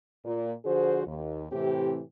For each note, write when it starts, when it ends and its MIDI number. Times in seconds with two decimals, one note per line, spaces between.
0.25 0.52 46
0.65 1.06 50
0.65 1.06 53
0.65 1.06 66
0.65 1.06 68
0.65 1.06 72
1.06 1.45 39
1.52 2.01 45
1.52 2.01 48
1.52 2.01 52
1.52 2.01 60
1.52 2.01 67